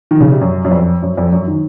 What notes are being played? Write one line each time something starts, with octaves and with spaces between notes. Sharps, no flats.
D#3
C#3
C3
F#2
F#2
F2
F#2
F2
F#2
D#3